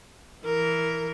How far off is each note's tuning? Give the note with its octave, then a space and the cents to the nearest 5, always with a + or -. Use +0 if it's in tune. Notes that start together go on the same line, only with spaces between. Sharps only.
E3 +0 A#4 +0